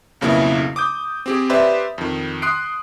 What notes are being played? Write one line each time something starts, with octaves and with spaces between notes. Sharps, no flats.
B1 F2 C#3 A#3 B3 E4
D6 D#6 G6
C4 G4 G#4
G4 B4 C5 D5 E5
F2 D#3
C6 D#6 F#6 C7 D7